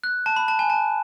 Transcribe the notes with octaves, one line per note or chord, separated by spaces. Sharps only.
F#6
A5
B5
A5
G#5
A5